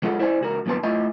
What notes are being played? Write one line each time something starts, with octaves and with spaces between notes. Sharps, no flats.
G#3 F4 A4 F#5
E4 C5 D5 E5 G#5
C#2 F#4 A#4
F#2 A#2 D#3 B3 A5 C6
A3 E4 F4 D#5 G#5